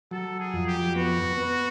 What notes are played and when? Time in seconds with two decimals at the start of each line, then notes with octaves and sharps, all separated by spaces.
0.11 F#3 A4
0.39 G#4
0.53 F2
0.67 G4
0.95 B3 F#4
1.37 B3